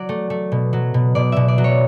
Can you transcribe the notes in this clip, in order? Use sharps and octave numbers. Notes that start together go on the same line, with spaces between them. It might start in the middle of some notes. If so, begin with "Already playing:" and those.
Already playing: F#3 D5
A3
A3
B2
F#3
B2
B2 D5
B2 E5
D5
F#3
C#5